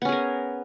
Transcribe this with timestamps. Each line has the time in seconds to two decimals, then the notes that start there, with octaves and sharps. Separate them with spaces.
0.02 B3
0.05 C#4
0.09 G#4
0.12 A#4